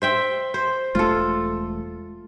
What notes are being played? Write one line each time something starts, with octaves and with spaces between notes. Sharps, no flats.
C5 E5 G5
C5
E1 G#3 A3 F4 A4